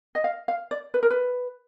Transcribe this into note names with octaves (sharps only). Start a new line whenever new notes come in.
D#5
F5
F5
D5
B4
A#4
B4